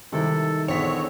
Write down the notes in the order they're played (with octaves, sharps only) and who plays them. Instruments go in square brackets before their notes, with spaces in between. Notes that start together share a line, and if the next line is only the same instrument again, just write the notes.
[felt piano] C3 G3 [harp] D#3 G#3 E4 [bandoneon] A4
[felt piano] A#1 B6 [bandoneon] E2 D3 C4 [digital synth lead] C#5 [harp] A#5